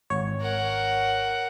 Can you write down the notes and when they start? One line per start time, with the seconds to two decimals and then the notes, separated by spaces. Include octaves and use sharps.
0.10 G#1 C#5
0.41 A#4 F#5